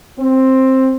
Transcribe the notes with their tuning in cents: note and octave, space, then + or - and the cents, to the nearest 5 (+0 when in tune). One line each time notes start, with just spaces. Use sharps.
C4 +10